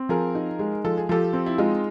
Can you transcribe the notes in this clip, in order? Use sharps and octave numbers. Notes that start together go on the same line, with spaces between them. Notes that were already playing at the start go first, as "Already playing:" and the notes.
Already playing: C4
F3 G#4 A#4
D#4
G#3
F3 A4
G#4
F3 G4 A4
C4
E4
G#3 D#4 F4